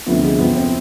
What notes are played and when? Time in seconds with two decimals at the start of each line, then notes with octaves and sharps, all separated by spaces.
0.06 D2 C3 F3 B3
0.22 G#3
0.39 F2 C3 F3 B3
0.55 C4